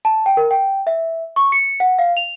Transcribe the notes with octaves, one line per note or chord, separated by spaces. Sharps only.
A5
G5
A#4
G5
E5
C#6
C#7
F#5
F5
F7